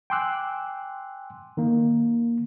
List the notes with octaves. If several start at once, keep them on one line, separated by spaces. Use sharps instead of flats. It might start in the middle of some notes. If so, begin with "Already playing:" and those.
G5 G#5 C6 D6 E6 F#6
D#3 A#3